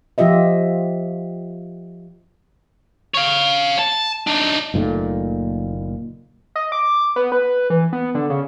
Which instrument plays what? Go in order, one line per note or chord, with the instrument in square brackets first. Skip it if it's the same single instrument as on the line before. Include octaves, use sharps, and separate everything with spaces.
[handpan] F3 F4 G4 D#5 E5
[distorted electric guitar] C#5 F5
A5
D4 D#4
[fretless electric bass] F#1 A#2 D#3 A3
[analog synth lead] D#5
D6
B3
B4
E3
B3
D3
C#3